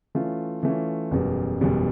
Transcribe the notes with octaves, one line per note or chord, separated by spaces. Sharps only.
E3 A3 C#4 F4
E3 A3 C#4 F4
F#1 E2 B2 G3
F#1 E2 B2 G3